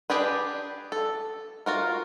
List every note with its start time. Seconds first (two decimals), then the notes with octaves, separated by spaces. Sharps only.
0.10 D4 G4 G#4 B4
0.92 A4
1.66 F4 F#4 A#4